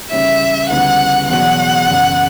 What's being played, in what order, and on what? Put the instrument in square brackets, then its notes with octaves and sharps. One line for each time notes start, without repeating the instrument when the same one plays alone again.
[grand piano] C#3 E3 G3 C#4 E4 [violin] E5
[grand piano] D2 C#3 E3 G3 B3 [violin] F#5
[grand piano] E1 E2 B2 F#3 [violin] F#5
[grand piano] F#1 E2 C#3